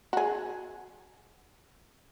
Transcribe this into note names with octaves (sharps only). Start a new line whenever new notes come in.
F#4 G#4